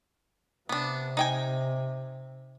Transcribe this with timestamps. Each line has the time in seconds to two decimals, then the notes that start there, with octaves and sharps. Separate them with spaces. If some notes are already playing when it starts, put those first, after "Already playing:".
0.69 C3 B3 D4
1.17 D#4 G5 G#5